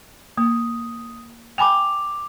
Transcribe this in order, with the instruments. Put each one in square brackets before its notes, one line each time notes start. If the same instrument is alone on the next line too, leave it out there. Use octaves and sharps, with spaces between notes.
[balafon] A#3 [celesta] D#6
[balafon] G5 G#5 B5 [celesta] D6 F7